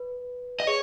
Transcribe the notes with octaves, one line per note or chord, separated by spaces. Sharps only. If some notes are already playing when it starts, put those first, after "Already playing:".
Already playing: B4
D#5
G#4 C#5